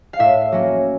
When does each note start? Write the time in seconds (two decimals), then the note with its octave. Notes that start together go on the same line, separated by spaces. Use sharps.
0.13 F5
0.19 A2 E5
0.52 F#3 A#3 C#4